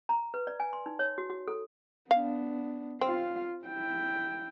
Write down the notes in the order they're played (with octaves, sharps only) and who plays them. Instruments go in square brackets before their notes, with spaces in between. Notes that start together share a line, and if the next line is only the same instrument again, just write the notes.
[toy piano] A#5
B4
D5
G#5
C6
D#4
C#5
F#4
F#4
A4
[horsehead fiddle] B3 D4 [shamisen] F5
[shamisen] C4 [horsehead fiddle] F4 F5
[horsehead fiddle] E4 G5